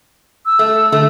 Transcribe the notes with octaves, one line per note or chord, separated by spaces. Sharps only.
E6
A3
D3 A3